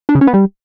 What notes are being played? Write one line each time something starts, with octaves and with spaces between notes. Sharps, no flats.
D4
C#3
C#4
B3
G3